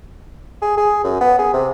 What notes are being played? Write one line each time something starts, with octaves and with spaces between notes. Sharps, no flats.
G#4
G#4
F#2
B3
G#4
C3